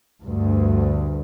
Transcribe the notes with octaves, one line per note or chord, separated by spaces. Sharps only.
D2 G2